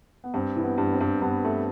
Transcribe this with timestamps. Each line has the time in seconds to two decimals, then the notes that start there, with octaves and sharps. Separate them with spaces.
0.24 B3
0.34 G2 C4
0.56 E3
0.63 B3
0.78 G2
0.93 C4
1.01 G2
1.22 G2 B3
1.45 A3